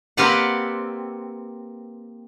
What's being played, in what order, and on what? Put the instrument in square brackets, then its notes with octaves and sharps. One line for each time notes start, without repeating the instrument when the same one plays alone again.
[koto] A#3 C4 G4 B4 D5 F#5